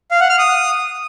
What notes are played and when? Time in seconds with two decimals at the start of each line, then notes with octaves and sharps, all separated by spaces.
0.11 F5
0.20 F#5
0.29 F6
0.39 D#6